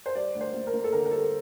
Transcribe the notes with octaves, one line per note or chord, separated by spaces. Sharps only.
C5
G3 D5
D2
C5
A#3
A#4
A#3
A4
D3 A#4
A#4
G3 A4